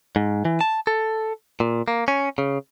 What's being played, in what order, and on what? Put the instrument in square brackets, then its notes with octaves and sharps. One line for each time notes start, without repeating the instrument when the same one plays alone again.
[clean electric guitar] G#2
E3
A5
A4
A#2
A#3
C#4
C#3